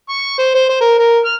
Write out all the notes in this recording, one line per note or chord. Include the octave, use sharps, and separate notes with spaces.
C#6
C5
C5
C5
A#4
A#4
F6